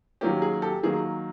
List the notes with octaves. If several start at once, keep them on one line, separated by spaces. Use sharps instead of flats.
D#3 F#3 A#3 C#4 G4
G#4
G4 A4
D#3 F#3 A#3 G#4